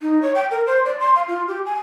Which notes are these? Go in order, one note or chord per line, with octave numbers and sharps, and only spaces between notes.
D#4
C#5
G5
A#4
C5
D5
C6
F5
F4
G4
G#5